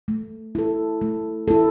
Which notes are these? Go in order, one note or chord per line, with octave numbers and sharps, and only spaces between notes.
A3
E4 A4
A3
E4 A4